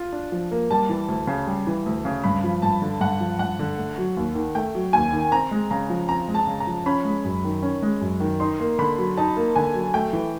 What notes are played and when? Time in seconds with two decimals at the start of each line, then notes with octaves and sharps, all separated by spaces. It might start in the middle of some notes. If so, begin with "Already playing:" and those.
Already playing: F4
0.13 D4
0.32 F3
0.51 A#3
0.71 G3 A5
0.89 E3
1.08 D2
1.27 C#3
1.47 G3
1.67 E3
1.86 D2
2.05 C#3
2.24 G2 B5
2.44 F3
2.62 G2 A5
2.82 D3
3.00 G2 F#5
3.20 F3
3.39 G2 F#5
3.59 D3
3.77 A3
3.98 F#3
4.17 D#2
4.35 D#3
4.55 A3 G5
4.75 F#3
4.93 D#2 G#5
5.13 D#3
5.32 C4 A#5
5.51 G#3
5.70 C#3 A#5
5.90 F3
6.09 C4 A#5
6.28 G#3
6.35 A5
6.47 C#3
6.60 A#5
6.67 F3
6.86 C#4 B5
7.05 G#3
7.24 F#2
7.44 D#3
7.63 C#4
7.82 G#3
8.01 F#2
8.20 D#3
8.40 D#4 C6
8.60 A#3
8.79 D3 B5
8.98 F#3
9.17 D#4 A5
9.37 A#3
9.55 D3 G#5
9.74 F#3
9.94 A3 G5
10.13 E3